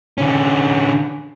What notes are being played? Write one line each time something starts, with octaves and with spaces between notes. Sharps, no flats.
D3 C#4